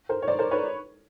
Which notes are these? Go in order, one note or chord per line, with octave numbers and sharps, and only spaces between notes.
A#4 C5
C#5
C5 D5
A#4 C5
B4 C#5